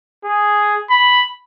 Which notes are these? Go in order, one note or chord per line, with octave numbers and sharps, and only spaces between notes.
G#4
B5